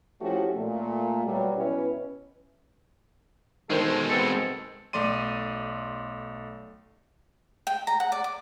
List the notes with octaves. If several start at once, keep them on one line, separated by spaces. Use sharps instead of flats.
F3 A3 C#4 E4 F#4 G4
A#2 A3
B2 F#3 G3
B2 C#4 E4 B4
B2 D#3 G#3 A4 C5
B3 C4 A4
B1 A3 D5 C6 D#7
G5
A#5
F#5
D5
D6